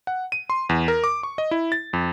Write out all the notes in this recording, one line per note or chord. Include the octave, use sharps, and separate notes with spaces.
F#5
D#7
C6
E2
A#4
D6
C#6
D#5
E4
A6
F2